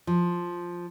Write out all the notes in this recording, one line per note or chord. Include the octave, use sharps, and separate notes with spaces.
F3